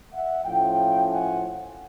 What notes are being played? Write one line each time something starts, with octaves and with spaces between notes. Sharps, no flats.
E5 F#5
A2 F3 A3 C#4 F5 G5
F#5 G#5